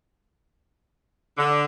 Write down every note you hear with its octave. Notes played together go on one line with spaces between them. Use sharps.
D3